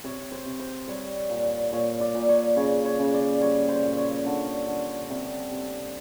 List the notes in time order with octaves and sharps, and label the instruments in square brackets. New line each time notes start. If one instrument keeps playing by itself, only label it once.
[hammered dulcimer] C3 C#5
C5
C3
C5
G3 C#5
A#2
A#2 C#5
D5
A#2
C#5
C#3 C#5
C#5
C#3
D5
G3 C#5
C5
A#2
C#5
D3
D3
C3
C3